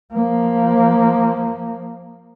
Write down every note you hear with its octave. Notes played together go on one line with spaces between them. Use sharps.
F3 A#3